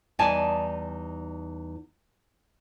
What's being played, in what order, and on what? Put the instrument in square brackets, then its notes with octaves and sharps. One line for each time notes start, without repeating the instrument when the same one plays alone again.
[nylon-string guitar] E2 G3 D#4 D5 G#5 A5